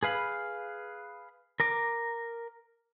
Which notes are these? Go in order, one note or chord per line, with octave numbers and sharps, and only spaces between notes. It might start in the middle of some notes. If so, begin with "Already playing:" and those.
G#4 B4 F5 B5
A#4 A#5 D6